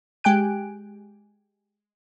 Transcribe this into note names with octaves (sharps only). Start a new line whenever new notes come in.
G#3 G4 G5 G#5 F#6 D7